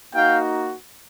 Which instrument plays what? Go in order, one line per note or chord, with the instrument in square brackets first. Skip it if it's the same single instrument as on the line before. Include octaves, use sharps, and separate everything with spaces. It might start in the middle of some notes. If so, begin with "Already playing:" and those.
[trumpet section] A#3 D#4 F#4 F5 G5